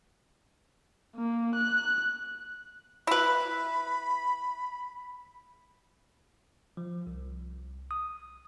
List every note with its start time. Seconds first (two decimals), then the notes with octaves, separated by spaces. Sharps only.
1.16 A#3
1.55 F#6
3.07 E4 B4 B5
6.77 F3
7.07 C2
7.91 D#6